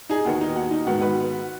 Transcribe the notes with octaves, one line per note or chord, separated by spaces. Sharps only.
D#4 G#4
D#2 D#3 B3 F#4
D#4
F#4
D#4
G#2 D#3 B3 F#4
F#4 B4